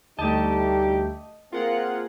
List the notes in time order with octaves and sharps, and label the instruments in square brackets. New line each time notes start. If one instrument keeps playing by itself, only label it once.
[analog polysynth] D2 A3 [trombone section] G3 D#4 G4 [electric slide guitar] D#5 A5
[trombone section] A#3 C4 G#4 [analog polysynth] F4 A#4 F#5